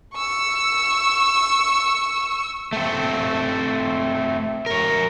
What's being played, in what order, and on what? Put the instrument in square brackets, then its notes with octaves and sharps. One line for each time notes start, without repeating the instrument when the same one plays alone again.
[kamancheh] C#6 E6
[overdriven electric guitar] A3 C4
A#4 C#5